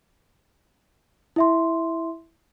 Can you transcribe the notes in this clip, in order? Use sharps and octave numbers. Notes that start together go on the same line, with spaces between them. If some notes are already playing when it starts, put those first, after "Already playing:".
E4 E5 C6